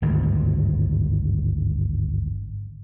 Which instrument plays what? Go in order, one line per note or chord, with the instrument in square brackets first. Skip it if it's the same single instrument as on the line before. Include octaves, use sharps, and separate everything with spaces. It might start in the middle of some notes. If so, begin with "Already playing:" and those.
[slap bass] G#1 D2 G2